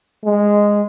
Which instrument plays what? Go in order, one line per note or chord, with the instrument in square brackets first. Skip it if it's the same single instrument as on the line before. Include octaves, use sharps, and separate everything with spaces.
[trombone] G#3